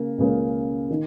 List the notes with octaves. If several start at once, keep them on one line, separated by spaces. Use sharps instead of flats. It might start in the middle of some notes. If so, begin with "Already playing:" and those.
Already playing: C#3 A#3
C#2 C#3 A#3
D#3